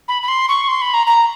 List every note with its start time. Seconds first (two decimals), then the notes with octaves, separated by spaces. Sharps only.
0.08 B5
0.22 B5
0.28 C6
0.49 C#6
0.68 C6
0.82 B5
0.94 A#5
1.07 A#5